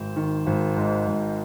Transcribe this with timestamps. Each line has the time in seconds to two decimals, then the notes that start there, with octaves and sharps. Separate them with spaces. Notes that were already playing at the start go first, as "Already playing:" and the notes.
Already playing: G#1 C5
0.16 D#3
0.47 G#1
0.77 G#2
1.07 G#1